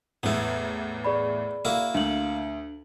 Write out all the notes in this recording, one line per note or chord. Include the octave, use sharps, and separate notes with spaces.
A1 E2 B3 E4
G#4 D5 B5
A#3 E4 F#4
D2 D4 F#7